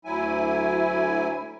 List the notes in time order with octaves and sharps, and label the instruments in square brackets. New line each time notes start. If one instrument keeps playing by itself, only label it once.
[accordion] D2 F#3 E4 G#5